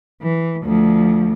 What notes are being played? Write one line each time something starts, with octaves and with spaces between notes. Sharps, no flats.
E3
D2 F3